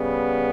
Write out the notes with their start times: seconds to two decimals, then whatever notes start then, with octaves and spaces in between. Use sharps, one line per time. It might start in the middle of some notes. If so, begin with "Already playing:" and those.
Already playing: C#3 G3 B3